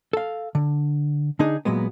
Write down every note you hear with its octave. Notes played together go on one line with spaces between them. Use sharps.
A4 F5
D3
D3 D4 D#4 G#4
A#2 F#3 G#3 B3